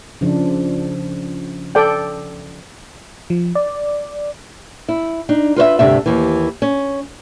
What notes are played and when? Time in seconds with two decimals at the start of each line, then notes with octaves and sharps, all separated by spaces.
0.21 C#3 F3 D4
1.75 A4 D5 G5
3.30 F3
3.55 D5
4.89 E4
5.29 D4 D#4
5.56 F4 B4 C#5 E5
5.79 D2 G2 C3 D4 E5
6.06 D#2 E3
6.62 C#4